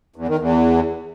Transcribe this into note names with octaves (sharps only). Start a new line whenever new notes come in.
E2
D#3
E2